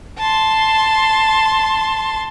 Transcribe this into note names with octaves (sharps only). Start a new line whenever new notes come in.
A5 C6